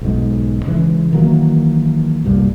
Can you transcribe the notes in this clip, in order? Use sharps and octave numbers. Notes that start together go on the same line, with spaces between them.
B1 G#2
C#3 E3 G#3
D#3 E3 F#3 A#3
C2 G2 A#2